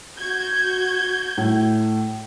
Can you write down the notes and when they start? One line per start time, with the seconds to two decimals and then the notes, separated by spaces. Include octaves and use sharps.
0.18 F#4 G6 G#6
1.38 A2